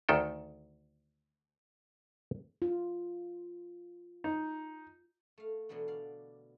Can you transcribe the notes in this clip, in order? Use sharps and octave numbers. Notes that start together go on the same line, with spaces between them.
D2 D#3 A4 G5
F4
D#4
A3 F5
B2 D3 E3 F#3 D4
D5 F5